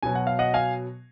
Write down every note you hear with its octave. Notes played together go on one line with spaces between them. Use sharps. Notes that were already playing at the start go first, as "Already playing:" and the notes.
B2 F#3 G#5
F#5
F5
D#5 F#5
F5 G#5